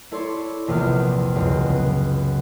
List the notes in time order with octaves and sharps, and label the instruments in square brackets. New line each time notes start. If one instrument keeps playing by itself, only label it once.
[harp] E4 A4 C#5 D5 C6
A#1 E2 C3 E4 F6
C#2 F#2
B3